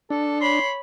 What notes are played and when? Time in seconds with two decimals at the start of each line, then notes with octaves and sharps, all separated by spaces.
0.10 D4 A4
0.41 C#5 B5 C6